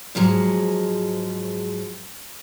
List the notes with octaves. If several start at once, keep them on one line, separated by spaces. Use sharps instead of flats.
G#2 F3 F#3 G#3